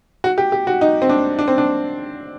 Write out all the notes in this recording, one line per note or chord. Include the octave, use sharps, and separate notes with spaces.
F#4
G4
G4
F#4
D#4
C4
D4
D4
C4
D4